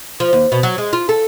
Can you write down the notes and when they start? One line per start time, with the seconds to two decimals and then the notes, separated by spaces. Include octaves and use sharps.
0.20 F3
0.33 D#2
0.52 B2
0.63 F#3
0.78 G#3
0.93 F4
1.09 A4